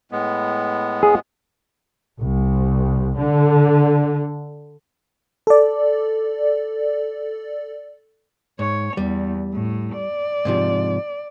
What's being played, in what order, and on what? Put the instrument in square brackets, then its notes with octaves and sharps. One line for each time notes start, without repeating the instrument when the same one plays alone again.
[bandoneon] A2 G#3 B3
[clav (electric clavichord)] G#4
[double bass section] C2
D3
[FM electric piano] A4 D5
[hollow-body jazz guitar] G#2 [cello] C#5
[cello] E2 [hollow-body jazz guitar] G3
[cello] A2
D5
[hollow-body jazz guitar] G#2 C3 F3